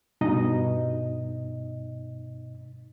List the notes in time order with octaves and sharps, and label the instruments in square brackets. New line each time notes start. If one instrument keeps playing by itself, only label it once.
[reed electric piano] G2 B2 D#4 D#5